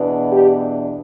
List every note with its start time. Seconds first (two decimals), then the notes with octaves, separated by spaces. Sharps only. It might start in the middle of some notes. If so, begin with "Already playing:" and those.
Already playing: E2 B2 B3 D4
0.32 G4